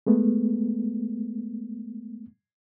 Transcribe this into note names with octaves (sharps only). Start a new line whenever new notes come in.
G#3 A3 B3